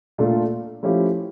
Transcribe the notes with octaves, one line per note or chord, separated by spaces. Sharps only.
A#2 A3 D4 F4 A4
F3 A3 C#4 E4 G4